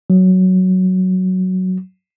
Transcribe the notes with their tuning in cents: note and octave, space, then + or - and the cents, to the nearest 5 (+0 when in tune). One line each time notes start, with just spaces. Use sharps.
F#3 +5